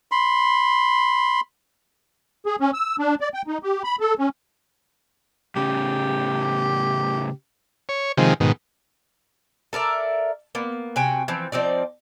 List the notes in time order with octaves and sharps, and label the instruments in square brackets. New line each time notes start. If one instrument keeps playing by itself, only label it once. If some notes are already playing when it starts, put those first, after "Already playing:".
[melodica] B5 C6
[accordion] G#4
C#4
E6
D4
D5
G5
D#4
G4
B5
A4
C#4
[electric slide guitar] A2 C#3 C#4 [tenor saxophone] G4
[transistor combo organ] C#5
C3 D#3 F3 G#3
G#2 B2 D#3
[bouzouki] A4 A#4 D5 E5
A#3 B3
C3 F#4 G5 G#5
E3 F3 C4
F3 C4 D#4 D5